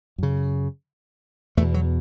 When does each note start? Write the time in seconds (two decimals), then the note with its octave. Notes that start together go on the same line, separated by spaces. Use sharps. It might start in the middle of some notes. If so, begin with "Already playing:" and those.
0.18 F#2 C#3
1.57 E2 A3
1.61 B2
1.74 F#3